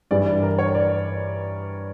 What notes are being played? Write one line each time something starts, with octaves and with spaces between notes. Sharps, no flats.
G2 E3 G3 D5
D5
A#4
C#5
D5